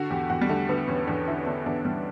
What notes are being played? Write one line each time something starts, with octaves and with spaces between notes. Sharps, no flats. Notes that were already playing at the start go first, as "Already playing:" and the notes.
Already playing: D3 F#4
E2 G4
E2 F#4
G3
D3 A3
D3 B3
E2 C#4
E2 D4
D3 E4
D3 D4
E2 D4
E2 G3